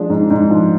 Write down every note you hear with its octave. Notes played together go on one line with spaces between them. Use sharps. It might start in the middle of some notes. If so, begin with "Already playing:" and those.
Already playing: F3 G#3 D4
G#2
G#2
F3